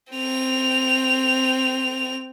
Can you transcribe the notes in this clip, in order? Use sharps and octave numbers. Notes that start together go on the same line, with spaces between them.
C4 F7